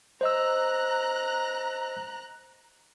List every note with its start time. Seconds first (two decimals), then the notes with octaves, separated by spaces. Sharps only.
0.21 C5 D#5 A#5 E6 F#6